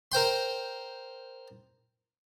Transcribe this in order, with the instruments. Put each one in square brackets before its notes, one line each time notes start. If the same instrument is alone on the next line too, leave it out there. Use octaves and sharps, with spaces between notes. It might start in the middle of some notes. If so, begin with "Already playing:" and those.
[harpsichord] A#4 C5 G5 C6